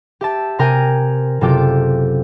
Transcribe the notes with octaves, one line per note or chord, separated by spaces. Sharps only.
G4 E5 A5
C3 A#4 G5 G#5 D#7
F#1 C3 F4 A4 G5 D6